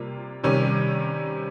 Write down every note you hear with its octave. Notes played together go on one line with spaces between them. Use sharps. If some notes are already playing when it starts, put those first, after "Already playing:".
Already playing: C3 G3 A#3 F4
C3 D#3 G3 C#4